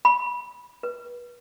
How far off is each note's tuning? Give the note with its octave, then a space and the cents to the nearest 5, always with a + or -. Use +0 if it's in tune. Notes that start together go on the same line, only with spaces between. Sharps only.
B5 -20
B4 -30